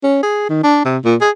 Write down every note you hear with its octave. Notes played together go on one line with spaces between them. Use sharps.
C#4
G#4
D#3
D4
C3
A#2
G#4